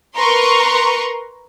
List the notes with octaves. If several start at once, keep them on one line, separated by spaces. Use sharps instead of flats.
A#4 B4 A#5 C6 C#6